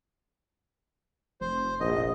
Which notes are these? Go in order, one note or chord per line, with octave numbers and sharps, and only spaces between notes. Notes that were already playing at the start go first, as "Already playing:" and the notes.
F1 C5
A#1 D#5